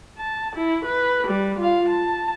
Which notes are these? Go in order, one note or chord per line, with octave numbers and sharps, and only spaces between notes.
A5
E4
B4
G3
F4 F5
A5